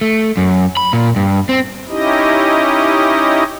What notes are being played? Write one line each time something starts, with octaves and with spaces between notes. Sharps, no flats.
A3
F#2
B5
A#2
G2
C4
C#4 D#4 E4 G4 D#5